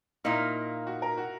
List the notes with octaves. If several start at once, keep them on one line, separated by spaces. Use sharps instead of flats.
A#2 A#3 D#4 E4
F#4
A#4
F#4